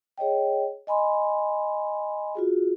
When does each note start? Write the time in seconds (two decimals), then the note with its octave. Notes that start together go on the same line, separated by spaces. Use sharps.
0.18 G#4 C#5 D#5 G5
0.87 D#5 G#5 B5 C6
2.35 F4 F#4 G#4